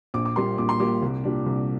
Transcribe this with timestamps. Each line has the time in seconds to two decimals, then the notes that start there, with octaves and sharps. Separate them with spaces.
0.14 A#1 D6
0.25 D6
0.36 A#2 G3 A#3 C6
0.58 A#1 D6
0.69 C6
0.80 A#2 G3 A#3 D6
1.02 C2
1.24 A#2 G3 D4
1.46 C2